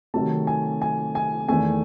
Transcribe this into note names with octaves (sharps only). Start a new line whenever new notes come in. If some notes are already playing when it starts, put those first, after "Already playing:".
C3 D#3 F#3 A3 A5
G#5
G#5
G#5
E2 D#3 A3 G#5